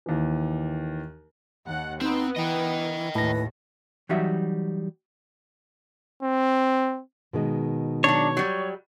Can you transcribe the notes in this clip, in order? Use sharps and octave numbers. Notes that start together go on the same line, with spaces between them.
D#2 E3
D#2 F#5
B3 C4 D#4
E3 D#5 G5
D#2 A2 B4 A#6
E3 F#3 G3 D#4 F#4 E5
C4
B2 D#3 G#3
F#3 D4 C#5
F#3 G3